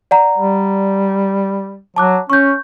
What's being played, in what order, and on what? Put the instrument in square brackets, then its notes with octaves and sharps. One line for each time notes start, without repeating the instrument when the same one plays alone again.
[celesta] D5 F#5 A#5
[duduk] G3
[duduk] F#3 [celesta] A5 D6 F#6
[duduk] C#4 [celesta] C#6 G6